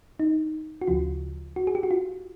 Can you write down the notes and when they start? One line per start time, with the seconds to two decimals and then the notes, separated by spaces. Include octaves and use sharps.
0.20 D#4
0.81 F#4
0.87 D2 C#3 F3 F4
1.56 F#4
1.67 G#4
1.75 G4
1.83 F#4
1.91 F4